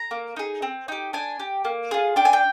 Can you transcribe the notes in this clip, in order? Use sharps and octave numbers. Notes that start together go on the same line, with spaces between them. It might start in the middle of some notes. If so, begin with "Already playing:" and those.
Already playing: A#5
A#3
D#4 G#4
C4
D#4 G4
D4 G#5
G4
A#3
F4 G#4
D4 G5
G#5
G5